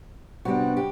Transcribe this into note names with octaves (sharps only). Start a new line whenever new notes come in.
C3 G3 B3 D4 F#4
G4